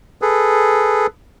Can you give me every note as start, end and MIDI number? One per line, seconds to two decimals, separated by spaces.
0.22 1.07 68
0.22 1.07 69
0.22 1.07 71